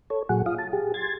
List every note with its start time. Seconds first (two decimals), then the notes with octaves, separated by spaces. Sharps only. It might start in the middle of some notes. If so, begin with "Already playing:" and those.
0.10 A4 C#5
0.29 A#2 F#3 G#4 F#5
0.46 F4 F5 D#6
0.59 A5
0.73 G4 G#4
0.94 C6 G#6 A6